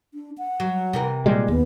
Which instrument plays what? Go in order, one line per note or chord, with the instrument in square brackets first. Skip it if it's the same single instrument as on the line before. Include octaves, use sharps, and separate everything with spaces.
[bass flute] D4
F#5
[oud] F#3
C3 E3 A#4
[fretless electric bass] A#2 G3 G#3
[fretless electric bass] D#2 [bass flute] B3